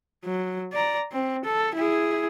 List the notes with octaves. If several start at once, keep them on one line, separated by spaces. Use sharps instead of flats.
F#3
D5 A#5
C4
A4
E4 G#4